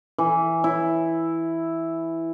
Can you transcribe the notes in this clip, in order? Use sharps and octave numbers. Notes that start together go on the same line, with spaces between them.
E3
E4